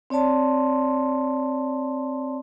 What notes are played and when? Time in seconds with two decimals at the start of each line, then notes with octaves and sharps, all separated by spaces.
0.10 C4 C#5 D5 A5 C6